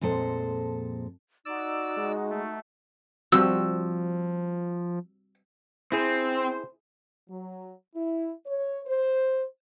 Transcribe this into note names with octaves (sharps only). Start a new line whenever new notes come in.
F2 A#2 G#3 A4 C5
D#4 F#4 D5 E6
G#3
A3
F3 G3 C4 F#4 E6
C4 E4 G#4 C5
F#3
E4
C#5
C5